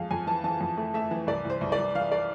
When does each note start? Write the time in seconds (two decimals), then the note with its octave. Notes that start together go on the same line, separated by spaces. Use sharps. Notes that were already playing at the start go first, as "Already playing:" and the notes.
Already playing: F2 G#3 F5
0.11 F2 G#5
0.27 E3 A5
0.44 E3 A5
0.61 F2
0.78 A3
0.94 A3 E5
1.11 E3
1.27 C2 D5
1.45 C2 C5
1.61 C2
1.72 D5
1.78 C2
1.95 E3 F5
2.12 D5